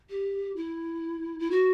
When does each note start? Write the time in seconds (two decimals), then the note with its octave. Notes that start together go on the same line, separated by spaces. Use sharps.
0.10 G4
0.56 E4
1.39 E4
1.51 F#4